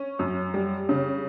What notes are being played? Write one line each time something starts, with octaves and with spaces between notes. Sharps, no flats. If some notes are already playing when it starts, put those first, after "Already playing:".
Already playing: C#4
F#2
G3
C#3